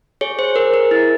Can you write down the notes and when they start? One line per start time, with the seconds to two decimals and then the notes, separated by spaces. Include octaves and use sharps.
0.21 G#4 C#5
0.39 C5
0.56 G#4 A#4
0.74 A#4
0.91 E4